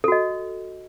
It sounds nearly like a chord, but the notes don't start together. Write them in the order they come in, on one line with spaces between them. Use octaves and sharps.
A4 F#4 D#5